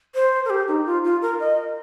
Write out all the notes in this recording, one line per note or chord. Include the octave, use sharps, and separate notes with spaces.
C5
A#4
G4
D#4
F4
F4
A#4
D#5